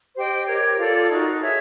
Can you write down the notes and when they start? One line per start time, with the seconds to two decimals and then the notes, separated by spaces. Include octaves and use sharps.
0.16 G4 C5 D#5 G5
0.47 G4 A#4 C#5
0.78 F4 A4 D5
1.09 D#4 F#4 A#4
1.41 G#4 C#5 E5